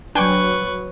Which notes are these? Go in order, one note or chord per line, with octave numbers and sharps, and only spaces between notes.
F#3 D4 B4 G5 G#5 C#6